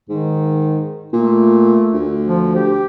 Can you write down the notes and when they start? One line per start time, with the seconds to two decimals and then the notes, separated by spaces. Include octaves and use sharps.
0.09 G#2 D#3
1.13 A#2 A3
1.93 D2
2.28 F3
2.56 G4